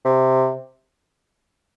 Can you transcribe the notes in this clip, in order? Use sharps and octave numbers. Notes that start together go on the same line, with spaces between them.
C3